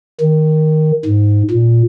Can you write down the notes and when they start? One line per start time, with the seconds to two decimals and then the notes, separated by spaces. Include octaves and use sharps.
0.21 D#3
1.06 G#2
1.51 A#2